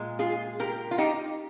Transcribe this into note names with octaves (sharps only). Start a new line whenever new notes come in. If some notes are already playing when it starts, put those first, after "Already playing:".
Already playing: A#2 G#3
F4 G#4
G4 A#4
F4
D#4 G4